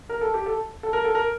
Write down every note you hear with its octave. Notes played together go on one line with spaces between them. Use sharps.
A#4
A4
G4
A4
A4
A#4
A4
A#4